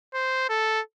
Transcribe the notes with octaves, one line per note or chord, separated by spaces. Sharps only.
C5
A4